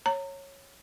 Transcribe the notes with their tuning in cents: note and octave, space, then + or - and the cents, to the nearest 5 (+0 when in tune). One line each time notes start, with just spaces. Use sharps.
C#5 -15 A#5 -25